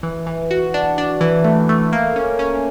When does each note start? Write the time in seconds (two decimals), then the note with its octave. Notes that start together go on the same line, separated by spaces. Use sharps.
0.03 E3
0.27 E3
0.51 F#4
0.74 D4
0.98 D4
1.21 E3
1.44 A3
1.69 A3
1.92 A#3
2.16 C#4
2.39 C#4